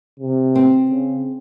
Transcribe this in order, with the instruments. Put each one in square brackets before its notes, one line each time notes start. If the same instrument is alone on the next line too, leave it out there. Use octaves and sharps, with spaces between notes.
[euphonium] C3
[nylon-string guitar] C4
[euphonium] C#3